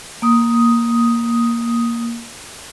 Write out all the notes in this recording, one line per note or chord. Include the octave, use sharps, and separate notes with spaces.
A#3 D#6